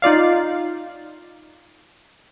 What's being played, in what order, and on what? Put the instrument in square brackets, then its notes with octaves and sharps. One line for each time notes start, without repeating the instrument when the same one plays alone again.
[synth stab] D#4 F4 D5 F5